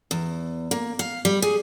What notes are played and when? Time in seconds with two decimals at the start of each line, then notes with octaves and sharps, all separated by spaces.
0.11 E2
0.71 A#3
0.99 F5
1.25 G3
1.42 G#4